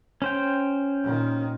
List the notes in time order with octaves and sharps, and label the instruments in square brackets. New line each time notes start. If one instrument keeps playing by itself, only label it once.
[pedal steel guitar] C#4 C5 G5
[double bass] A#2 D#3